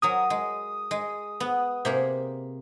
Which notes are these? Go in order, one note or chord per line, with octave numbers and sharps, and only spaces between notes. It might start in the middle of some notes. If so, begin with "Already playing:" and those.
F#3 A#4 G#5 D#6
G#3
G#3
B3
C3 A#3 G#4